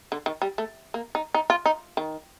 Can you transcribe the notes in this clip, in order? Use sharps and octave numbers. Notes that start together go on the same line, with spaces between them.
D3
D#3
G3
A3
A#3
D#4
D#4
F4
D#4
D#3